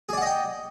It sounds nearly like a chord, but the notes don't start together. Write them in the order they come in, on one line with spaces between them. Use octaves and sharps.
G#4 D5 F#5 D#5 G5